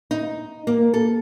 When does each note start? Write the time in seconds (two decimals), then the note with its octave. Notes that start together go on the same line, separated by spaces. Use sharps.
0.11 D#4
0.67 A#3
0.94 A4